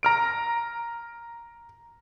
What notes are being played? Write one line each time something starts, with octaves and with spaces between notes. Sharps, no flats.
A#5 F6 D7